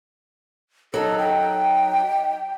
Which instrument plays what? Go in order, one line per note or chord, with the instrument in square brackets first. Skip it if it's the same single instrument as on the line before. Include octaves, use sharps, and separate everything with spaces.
[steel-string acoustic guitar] F#3 D#4 [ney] A4
[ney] G5